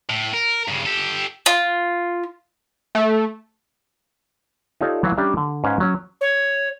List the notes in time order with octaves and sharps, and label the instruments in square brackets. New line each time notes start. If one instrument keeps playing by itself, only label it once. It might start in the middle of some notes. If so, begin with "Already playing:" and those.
[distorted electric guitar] A2
A#4
G2 C#3
G4 A4
[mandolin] F4
[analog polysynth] A3
[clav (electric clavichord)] D#4 F4 G4 A4 C#5 D5
E3 F#3 F#4 E5 F5
G3 C#4 D4 G4 E5 A#5
D3
G#2 C#4 B4 F5 F#5
F#3 C#4
[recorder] C#5